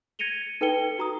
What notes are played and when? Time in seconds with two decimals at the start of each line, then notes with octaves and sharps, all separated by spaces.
0.19 G#6 A#6 C#7 D#7 F7 G7
0.61 D#4 A4 B4 G5 C#7 G7
0.98 F#4 A#5 D#6